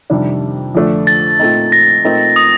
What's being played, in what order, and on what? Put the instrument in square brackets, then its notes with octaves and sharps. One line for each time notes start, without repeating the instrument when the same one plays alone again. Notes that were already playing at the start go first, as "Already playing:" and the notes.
[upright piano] F2 C3 D#3 G3 D4
F2 D3 F3 A3 D4
[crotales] A6
[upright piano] A#2 A3 C4 D#4
[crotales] A#6
[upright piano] A#2 A3 C4 D#4 A#4
[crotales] D#6